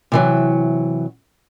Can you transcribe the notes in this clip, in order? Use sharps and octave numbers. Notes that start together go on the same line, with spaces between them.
C3 E3 F#3